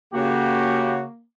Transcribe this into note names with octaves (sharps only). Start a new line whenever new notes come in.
C#3 A#3 F#4 G4